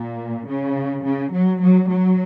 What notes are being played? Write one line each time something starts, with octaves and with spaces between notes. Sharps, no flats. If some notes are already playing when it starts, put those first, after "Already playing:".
Already playing: A#2
C#3
C#3
F#3
F#3
F#3